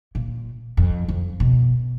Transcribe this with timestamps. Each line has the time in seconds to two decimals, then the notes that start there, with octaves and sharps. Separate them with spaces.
0.15 A#2
0.77 F2
1.08 F2
1.40 B2